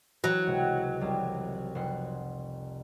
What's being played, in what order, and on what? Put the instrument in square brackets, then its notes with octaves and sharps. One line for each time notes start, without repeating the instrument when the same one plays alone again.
[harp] E3 [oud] F#3
[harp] C#2 C3
F1 C2 D5
F1 F#5 C6